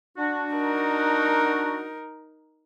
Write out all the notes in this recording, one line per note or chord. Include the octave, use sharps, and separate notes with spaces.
D4 F#4
D#4 A#4